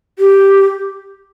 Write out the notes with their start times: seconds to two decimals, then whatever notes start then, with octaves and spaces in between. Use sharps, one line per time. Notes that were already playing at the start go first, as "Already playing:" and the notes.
0.19 G4